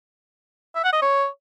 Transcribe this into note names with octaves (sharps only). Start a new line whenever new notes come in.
E5
F#5
D#5
C#5